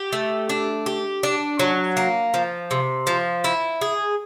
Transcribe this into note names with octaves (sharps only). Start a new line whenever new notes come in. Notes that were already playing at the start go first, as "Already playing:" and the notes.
Already playing: G4
A3
D4
G4
D4
F#3
A#3
F3
C3
F3
E4
G#4